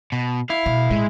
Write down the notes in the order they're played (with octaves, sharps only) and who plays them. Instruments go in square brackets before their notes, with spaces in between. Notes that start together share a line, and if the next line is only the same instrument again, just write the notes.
[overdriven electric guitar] B2
[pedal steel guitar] E4 [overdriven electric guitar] F5
[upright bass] B2
[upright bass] A2 [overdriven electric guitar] G#3